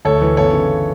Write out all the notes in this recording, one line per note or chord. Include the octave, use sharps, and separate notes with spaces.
D2 A4 C#5
E3
G1 A4 C#5
C#3